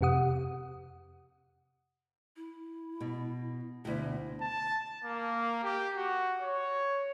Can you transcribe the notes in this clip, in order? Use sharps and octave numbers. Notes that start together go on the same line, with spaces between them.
F2 C3 G4 F#5 D#6
E4
B2
D2 B2 E4
A5
A#3
G4
F#4
C#5